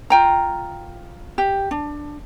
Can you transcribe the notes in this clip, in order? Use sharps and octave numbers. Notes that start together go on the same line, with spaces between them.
F4 G5 A#5
G4
D4